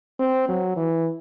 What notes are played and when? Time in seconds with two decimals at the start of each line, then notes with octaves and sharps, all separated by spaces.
0.19 C4
0.48 F#3
0.76 E3